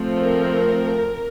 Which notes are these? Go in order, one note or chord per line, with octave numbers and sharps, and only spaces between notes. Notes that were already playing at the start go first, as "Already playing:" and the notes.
Already playing: F3 A3 C4
A#4